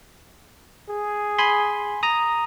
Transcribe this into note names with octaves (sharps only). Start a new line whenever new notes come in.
G#4
G#5 B5 C6
A#5 D#6